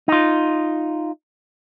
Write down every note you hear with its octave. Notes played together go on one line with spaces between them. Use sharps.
D#4 F4